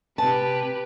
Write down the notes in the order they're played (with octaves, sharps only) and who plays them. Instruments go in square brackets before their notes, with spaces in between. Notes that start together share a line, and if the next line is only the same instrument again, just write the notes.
[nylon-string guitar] C3 A5 [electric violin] G4 B4